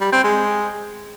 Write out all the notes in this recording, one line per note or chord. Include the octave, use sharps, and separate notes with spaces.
G3
C4
G#3